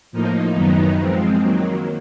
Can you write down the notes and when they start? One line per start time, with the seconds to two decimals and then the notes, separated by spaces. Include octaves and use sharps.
0.12 A2 F3 A#3 D#4
0.54 F#2 D#3 F#3 B3 D#4
0.98 F3 G#3 C4
1.40 D#3 F#3 A#3